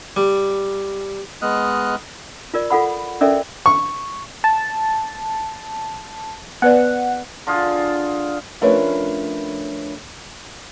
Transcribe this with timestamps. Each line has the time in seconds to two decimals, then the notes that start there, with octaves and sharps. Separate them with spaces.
0.16 G3
1.42 G#3 B3 D#5 D#6 F6 F#6
2.54 F4 A#4 D5
2.70 F4 A4 F#5 B5
3.21 C#4 A4 A#4 D5 E5
3.66 C#6
4.44 A5
6.62 B3 B4 D5 F#5
7.47 D3 F4 G#4
8.61 F3 A3 C#4 D4 A#4 B4